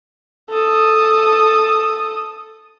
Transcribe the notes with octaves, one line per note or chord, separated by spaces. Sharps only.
A4 D#6